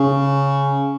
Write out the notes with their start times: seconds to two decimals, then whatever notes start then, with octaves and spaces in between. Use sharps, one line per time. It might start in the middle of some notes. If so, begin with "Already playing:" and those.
Already playing: C#3